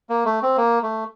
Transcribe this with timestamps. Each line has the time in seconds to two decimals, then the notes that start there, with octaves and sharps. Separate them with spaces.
0.09 A#3
0.25 A3
0.42 C4
0.57 A#3
0.83 A3